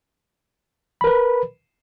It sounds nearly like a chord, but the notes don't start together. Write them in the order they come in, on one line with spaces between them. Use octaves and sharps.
B5 A#4 B4